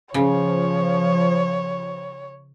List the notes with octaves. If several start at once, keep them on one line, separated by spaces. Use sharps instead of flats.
C#3 F3 C#5